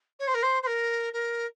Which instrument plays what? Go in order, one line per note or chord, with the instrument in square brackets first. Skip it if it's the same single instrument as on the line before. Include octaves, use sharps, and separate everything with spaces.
[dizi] C#5
C5
A#4
C5
C5
A#4
A#4